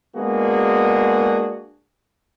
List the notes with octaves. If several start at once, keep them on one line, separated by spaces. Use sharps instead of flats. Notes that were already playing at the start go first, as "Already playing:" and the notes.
G#3 A#3 B3 D4 F#4 G#4